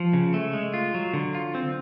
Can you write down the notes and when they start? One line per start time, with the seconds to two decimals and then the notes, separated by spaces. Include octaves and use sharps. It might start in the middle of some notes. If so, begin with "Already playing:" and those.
Already playing: F3
0.13 C#3
0.34 A3
0.53 G#3
0.74 F4
0.94 F#3
1.13 D3
1.35 F4
1.55 C4